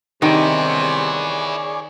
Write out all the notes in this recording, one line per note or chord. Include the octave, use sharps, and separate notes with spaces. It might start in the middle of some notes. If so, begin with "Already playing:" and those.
G2 C3 D#3 B3 E4 G#4 C#5 D5